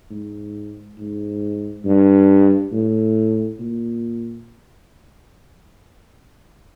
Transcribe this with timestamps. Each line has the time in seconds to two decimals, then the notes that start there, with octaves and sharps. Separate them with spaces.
0.11 G#2
0.98 G#2
1.85 G2
2.72 A2
3.59 A#2